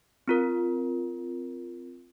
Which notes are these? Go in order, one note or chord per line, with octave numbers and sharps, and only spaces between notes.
C4 F4 A#4